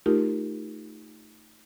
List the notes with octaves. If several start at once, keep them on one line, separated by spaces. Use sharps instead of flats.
A3 D#4 F4 G4 A#4